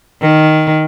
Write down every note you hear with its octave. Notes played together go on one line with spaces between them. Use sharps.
D#3